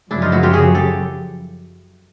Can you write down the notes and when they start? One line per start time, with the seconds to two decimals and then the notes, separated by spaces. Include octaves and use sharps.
0.11 F#2 C#3 F3 D4 E4
0.22 D#4 F4
0.32 E4 F#4
0.43 F4 G4
0.53 F#4 G#4
0.75 G4 A4